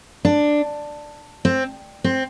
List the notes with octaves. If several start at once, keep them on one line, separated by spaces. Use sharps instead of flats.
D4
C4
C4